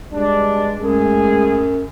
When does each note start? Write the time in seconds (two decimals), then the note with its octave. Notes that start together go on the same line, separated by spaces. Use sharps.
0.12 G2 G#3 D4
0.79 F#2 G#3 A3 G#4